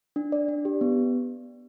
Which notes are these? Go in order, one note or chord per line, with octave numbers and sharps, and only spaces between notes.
D4
D5
D4
G4
B3